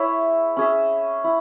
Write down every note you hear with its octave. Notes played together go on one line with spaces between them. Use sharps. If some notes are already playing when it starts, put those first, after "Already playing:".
Already playing: E4 G#4 C#5 E5
C#4 G#4 E5
E4